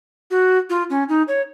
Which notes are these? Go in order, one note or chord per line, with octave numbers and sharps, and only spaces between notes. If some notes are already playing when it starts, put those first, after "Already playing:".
F#4
F4
C#4
D#4
C#5